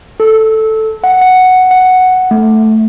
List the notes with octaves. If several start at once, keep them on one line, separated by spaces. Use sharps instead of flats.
A4
F#5
F#5
F#5
A3